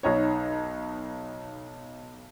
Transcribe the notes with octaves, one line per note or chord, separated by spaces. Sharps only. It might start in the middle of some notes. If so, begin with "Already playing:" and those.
B1 D#4 C#5